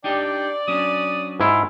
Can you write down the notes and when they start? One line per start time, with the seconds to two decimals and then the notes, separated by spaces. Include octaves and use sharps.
0.04 D4 D#4 G4 D5 G5
0.68 F#3 C#4 D4 D#6
1.40 G#2 E4 F4